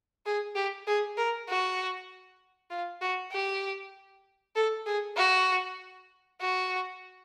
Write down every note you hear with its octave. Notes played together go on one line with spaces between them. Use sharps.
G#4
G4
G#4
A#4
F#4
F4
F#4
G4
A4
G#4
F#4
F#4